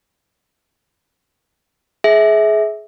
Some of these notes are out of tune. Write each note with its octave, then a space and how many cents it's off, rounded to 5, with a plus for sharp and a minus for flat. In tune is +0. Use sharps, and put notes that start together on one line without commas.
G#4 +25 E5 -20